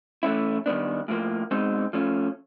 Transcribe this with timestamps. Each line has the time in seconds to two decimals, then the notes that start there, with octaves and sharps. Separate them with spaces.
0.23 E3 A3 C#4 E4
0.66 D#3 G3 B3 D4
1.08 A2 F3 A#3
1.51 B2 G#3 C4 D#4
1.93 F3 A3 C#4